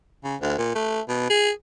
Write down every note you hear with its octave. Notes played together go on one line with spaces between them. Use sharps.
C#3
D2
A#2
A3
B2
G#4